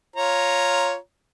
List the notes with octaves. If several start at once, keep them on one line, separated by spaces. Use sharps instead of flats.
F4 C#5 A#5